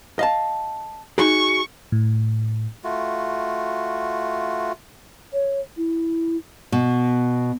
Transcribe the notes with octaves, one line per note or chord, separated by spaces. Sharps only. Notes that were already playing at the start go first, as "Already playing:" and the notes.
D#5 F5 A5
D#4 F#4 G#4 C#6
A2
A3 F4 F#4
C#5
E4
B2